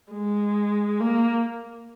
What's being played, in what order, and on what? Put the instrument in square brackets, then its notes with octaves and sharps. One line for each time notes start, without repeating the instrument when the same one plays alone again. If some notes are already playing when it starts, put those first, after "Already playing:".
[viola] G#3
A#3